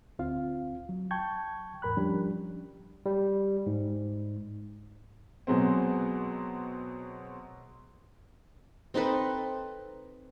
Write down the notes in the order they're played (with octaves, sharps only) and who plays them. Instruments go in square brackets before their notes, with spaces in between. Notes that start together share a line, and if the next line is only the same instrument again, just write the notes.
[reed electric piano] D2 C4 F4 F5
F#3
G5 A5 C#6 G6 G#6
E2 G#2 A#4 B5 F#6
F3 G3 C#4 D4 G4
[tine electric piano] G3
G#2
[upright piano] B2 F#3 G#3 C4
[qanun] C4 D#4 A4 B4